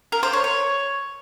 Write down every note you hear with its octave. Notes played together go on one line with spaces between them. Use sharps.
A#4
C5
C#5
C#5